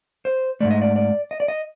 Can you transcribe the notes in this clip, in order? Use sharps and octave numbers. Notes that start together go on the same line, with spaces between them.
C5
G#2 E3 A3 D5
D#5
D5
D5
D#5
D5
D#5